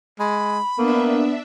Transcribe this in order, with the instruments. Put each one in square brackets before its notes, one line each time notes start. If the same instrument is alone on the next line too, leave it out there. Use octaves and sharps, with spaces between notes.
[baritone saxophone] G#3 [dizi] B5
[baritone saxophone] A#3 [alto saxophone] B3 [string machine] D4 E5